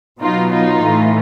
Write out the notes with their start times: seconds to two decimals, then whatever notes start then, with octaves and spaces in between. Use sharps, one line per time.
0.21 B2 F#3 B3 D#4 F4
0.53 D#4 F4
0.84 A2 E3 A3